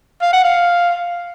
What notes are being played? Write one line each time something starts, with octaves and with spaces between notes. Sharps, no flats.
F5
F#5
F5